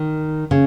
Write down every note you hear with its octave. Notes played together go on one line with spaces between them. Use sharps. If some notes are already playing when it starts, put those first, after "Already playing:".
Already playing: D#3
C#3